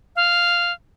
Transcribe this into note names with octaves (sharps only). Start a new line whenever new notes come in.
F5